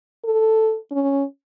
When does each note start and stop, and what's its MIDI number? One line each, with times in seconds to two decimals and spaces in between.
0.24 0.77 69
0.92 1.24 61